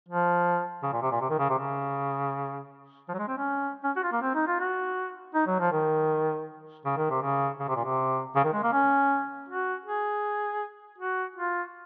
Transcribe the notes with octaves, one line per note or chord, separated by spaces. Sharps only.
F3
C#3
A#2
C3
A#2
C3
D#3
C#3
C3
C#3
F3
F#3
G#3
C4
C#4
C#4
F#4
F4
A#3
C4
D#4
F4
F#4
D#4
F#3
F3
D#3
C#3
D#3
C3
C#3
C#3
C3
A#2
C3
C#3
D#3
G#3
A#3
C#4
F#4
G#4
F#4
F4